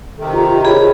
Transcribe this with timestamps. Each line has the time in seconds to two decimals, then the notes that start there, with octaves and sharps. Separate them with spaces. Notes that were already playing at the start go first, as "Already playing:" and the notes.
0.18 C3 D#3 A4
0.34 F4 G4 A#5
0.65 G#4 C#5 B5